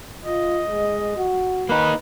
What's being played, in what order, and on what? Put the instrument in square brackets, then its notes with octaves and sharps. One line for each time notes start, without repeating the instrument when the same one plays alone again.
[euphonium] F4 [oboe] D#5
[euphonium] G#3
F#4
[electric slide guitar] A#3 D#4 [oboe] B4